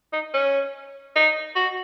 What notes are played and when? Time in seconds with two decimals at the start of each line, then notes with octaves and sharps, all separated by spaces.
0.13 D#4
0.34 C#4
1.16 D#4
1.56 F#4